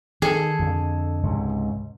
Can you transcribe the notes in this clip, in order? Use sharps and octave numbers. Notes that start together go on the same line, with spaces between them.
D#3 G#4 A4
F2 D3
C#2 G#2 C3